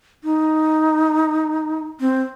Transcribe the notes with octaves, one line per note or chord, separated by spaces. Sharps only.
D#4
C4